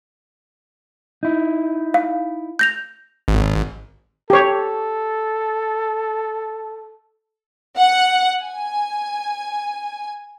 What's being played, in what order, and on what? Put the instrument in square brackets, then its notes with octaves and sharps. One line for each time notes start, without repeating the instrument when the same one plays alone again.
[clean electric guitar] D#4 E4
[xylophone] F5
G6 A#6 F7
[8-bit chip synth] G#1
[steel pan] G4 C#5 [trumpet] A4
[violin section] F#5
G#5